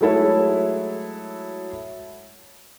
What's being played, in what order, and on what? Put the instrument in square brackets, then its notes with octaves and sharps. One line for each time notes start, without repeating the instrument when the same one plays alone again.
[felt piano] F#3 G#3 A3 E4 A4 C#5